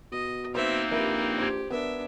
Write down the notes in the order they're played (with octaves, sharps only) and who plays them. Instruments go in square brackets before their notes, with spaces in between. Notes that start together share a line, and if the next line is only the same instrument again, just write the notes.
[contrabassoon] B2 [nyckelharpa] D#5
[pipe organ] A#3 C4 D#4 [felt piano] B4 C5 [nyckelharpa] E5
[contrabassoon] A#1 [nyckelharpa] G4 B4 [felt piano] A#4 E5
[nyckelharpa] G4 [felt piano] C5 G#6
[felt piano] B3 A#4 [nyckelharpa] D4 E5